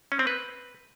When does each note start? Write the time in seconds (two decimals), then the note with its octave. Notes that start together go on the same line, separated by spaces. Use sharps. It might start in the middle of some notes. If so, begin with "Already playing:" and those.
0.12 C#4
0.19 C4
0.27 B4